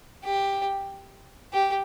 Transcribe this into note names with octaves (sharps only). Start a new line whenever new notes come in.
G4
G4